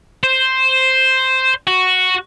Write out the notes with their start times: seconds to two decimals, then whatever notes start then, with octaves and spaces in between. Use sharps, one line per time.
0.23 C5
1.67 F#4